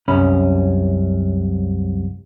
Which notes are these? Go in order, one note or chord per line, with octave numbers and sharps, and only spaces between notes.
C2 F#2 C#4 B5